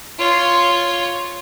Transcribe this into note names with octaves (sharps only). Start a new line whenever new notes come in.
F4 C#5